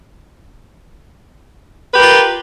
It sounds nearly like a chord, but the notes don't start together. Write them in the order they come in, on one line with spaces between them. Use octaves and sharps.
B4 G4 A#4 F4